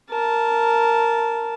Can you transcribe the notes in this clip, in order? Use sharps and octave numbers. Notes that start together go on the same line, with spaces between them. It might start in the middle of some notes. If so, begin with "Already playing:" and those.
A#4 A5